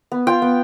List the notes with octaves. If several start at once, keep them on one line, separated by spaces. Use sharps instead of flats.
B3
F4 G5
B3